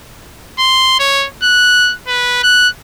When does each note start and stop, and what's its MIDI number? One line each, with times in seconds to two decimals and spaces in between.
0.59 0.96 84
1.00 1.26 73
1.43 1.93 90
2.08 2.42 71
2.44 2.68 90